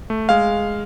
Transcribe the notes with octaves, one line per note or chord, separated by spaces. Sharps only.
A3
G#3 F5